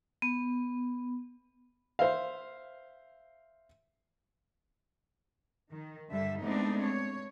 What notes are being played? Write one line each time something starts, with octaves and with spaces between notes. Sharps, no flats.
B3
C5 E5 F5
D#3
G2 D3 G3 E5
G#3 A3 B3 C4 D4 D#4
C#5